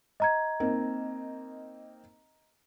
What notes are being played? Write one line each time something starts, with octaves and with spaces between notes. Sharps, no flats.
D#5 A#5 G#6
A#3 C4 D#4